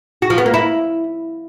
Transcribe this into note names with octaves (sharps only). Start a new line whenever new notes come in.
F#4
F3
B3
A#3
E4